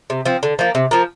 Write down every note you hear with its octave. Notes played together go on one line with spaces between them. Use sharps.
C3
F3 C4
D3
F3 A#3
C3
F3 A#3